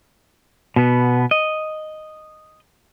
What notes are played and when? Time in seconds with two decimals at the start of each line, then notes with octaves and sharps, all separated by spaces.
0.76 B2 B3
1.31 D#5